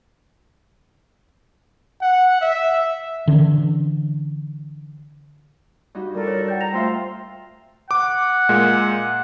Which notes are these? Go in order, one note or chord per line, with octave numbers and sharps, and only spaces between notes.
F#5
E5
D3 E3 C#4
G2 D#4 F#4
G3 F4 A4 A#4 D5
C#5
F#5 G5 G6
A#5 A#6 E7 F7
A3 F4 C5 E5 G5 A5 C6 E6
F#5 D6
A#2 G#3